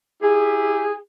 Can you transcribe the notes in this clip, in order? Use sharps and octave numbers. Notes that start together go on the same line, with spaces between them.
E4 G4 G#4